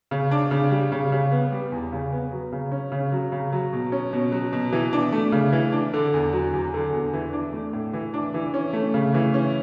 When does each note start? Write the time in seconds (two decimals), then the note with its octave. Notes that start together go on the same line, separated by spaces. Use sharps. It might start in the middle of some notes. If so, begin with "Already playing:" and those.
0.11 C#3
0.31 D4
0.51 C#3
0.71 G3
0.92 C#3
1.12 C#3
1.31 B3
1.52 G3
1.72 E2
1.92 C#3
2.12 B3
2.32 F#3
2.52 C#3
2.72 C#4
2.92 C#3
3.12 F#3
3.32 C#3
3.52 F#3
3.73 B2
3.92 C#4
4.13 B2
4.32 F#3
4.53 B2
4.72 E3
4.93 D4
5.12 A3
5.32 C#3
5.52 E3
5.72 D4
5.93 D3
6.14 E2
6.33 F#3
6.53 E2
6.74 D3
6.93 E2
7.13 E3
7.33 D4
7.53 A3
7.73 A2
7.93 E3
8.14 D4
8.34 E3
8.54 C#4
8.73 A3
8.94 C#3
9.14 E3
9.34 C#4